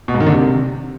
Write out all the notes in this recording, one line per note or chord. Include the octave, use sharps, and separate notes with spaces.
B2
G#2
D#3
D3
C3